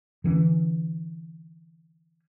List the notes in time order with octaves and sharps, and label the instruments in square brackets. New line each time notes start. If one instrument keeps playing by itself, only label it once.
[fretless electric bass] D3 E3 C#4